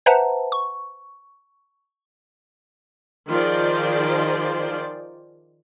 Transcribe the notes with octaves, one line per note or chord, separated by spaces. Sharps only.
B4 C5 E5 F#5 A5 A#5
C#6
D#3 F3 F4 G#4 C5 D5